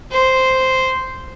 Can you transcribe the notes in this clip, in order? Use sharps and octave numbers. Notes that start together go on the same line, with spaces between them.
C5